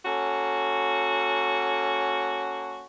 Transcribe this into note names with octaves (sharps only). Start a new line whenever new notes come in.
A#3 C#4 F#4 A4